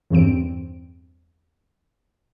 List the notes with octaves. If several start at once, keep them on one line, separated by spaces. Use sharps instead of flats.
E2 G2 C4 D7